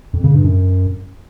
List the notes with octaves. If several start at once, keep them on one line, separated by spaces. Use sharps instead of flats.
F2
C#3
G2
F#2